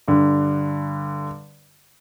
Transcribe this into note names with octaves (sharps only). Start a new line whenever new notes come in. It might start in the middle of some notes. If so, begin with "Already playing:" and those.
G2 D3